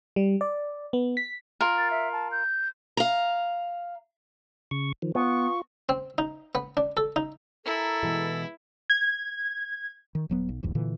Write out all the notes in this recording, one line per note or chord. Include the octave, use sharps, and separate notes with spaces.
G3
D5
B3
B6
F4 A#4
A6
E5
A5
G6
F5 A#5
C#3 C#6
D#3 F3
B3 F4 C#6
C4
D#4
B3
D4
A4
D#4
E4 A4 A#4 G#5 A#5
B2 E3 G#3
G#6
D#3
D#1 F#3 B3
B1
D#1 A#1 E2 G#2
A#2 D3 E3